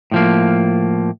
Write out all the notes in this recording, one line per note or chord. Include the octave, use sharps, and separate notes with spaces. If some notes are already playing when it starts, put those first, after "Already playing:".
A2 F3 A#3